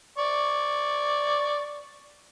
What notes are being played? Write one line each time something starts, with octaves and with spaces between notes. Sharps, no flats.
D5 C#6